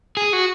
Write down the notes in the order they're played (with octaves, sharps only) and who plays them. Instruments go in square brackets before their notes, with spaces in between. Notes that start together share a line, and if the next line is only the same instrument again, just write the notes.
[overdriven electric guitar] G#4
F#4